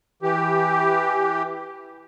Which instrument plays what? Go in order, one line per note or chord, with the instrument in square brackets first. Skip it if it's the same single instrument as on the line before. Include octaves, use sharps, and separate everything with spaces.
[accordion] E3 G4